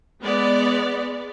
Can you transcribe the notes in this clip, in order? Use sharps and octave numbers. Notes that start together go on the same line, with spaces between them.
G#3 B3 D5